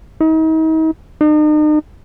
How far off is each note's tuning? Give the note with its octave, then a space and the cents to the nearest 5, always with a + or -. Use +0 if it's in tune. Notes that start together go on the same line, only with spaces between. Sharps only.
D#4 +40
D#4 -40